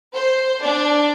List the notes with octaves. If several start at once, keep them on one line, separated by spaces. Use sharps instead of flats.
C5
D4